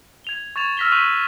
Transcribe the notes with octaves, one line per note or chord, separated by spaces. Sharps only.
G#6 F7 G7
C#6 G#6 A6 E7 F7
E6 F6 A#6 B6 F7 G7
C#6 F#6 B6 D#7 F7 F#7